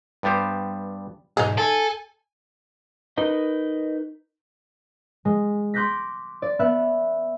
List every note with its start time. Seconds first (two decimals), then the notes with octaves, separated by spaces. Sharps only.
0.23 G2 G3 B3 G4 C5
1.37 B1 G#2 D#4 G#4
1.58 A4 G#5
3.17 D#4 A#4 B4 D#5
5.25 G#3
5.74 C6 D6 F#6 G6 A#6 B6
6.42 D5
6.59 B3 E5 F#6